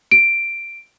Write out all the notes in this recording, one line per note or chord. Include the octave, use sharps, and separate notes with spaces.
D7